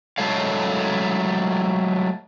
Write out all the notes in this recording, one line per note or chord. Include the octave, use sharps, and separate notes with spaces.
F#3 G#3 A3 A4 C#5 F5